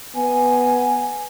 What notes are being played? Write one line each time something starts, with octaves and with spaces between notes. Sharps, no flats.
B3 G#5